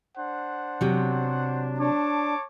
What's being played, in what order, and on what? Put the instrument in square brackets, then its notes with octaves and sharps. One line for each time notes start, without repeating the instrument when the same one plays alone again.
[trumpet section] D4 C5 F#5
[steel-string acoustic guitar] C3 F#3
[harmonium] D4 [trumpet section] C#5 A5 D6